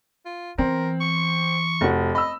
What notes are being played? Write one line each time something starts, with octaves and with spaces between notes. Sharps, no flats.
F4
E3 B3 C4 A#4
C#6
F1 F#4
D#5 B5 E6